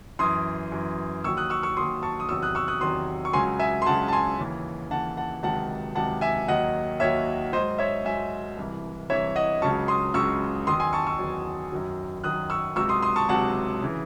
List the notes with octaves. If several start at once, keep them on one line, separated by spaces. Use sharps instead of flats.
F#2 E3 C6 D#6
F#2 E3
D#2 D#3 F#3 C#6 E6
D#6 F#6
C#6 E6
C#6 E6
D#2 D#3 F#3 C6 D#6
A5 C#6
D#6
E2 C3 D#3 F#3 C#6 E6
D#6 F#6
C#6 E6
D#6 F#6
E2 C3 D#3 F#3 C6 D#6
C#6
C#2 C#3 F#3 G#5 C6
E5 G#5
C6
C#2 C#3 F#3 F#5 A5
A5
G#5 C6
D#2 C#3 E3
D#2 C#3 E3 F#5 A5
F#5 A5
C#2 C3 D#3 F#3 F#5 A5
C#2 C3 D#3 F#3 F#5 A5
E5 G#5
D#2 D#3 F#3 D#5 F#5
D#2 D#3 F#3 C#5 E5
G#2 F#3 C5 D#5
C#5 E5
G#2 F#3 E5 G#5
C2 C3 E3
C2 C3 E3 C#5 E5
D#5 F#5
C#2 C#3 F#3 A5 C#6
C6 D#6
C#2 C#3 F#3 C#6 E6
E2 D#3 F#3 C6 D#6
G#5 C6
A5 C#6
C#6 E6
E2 D#3 F#3
F#2 D#3 F#3
F#2 D#3 F#3 D#6 F#6
C#6 E6
C#2 C3 F#3 C#6 E6
C6 D#6
C6 D#6
A5 C#6
C#2 C3 F#3 F#5 A5
C#3 E3